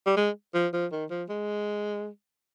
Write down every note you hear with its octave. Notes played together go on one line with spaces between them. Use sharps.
G3
G#3
F3
F3
D#3
F3
G#3